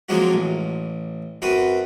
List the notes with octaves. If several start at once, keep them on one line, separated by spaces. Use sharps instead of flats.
F3 F#3 G#3 A#3 C4 F#4
A1
F#2 C4 F#4 B4 D#6